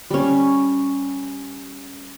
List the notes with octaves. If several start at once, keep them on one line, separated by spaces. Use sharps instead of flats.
G3 C#4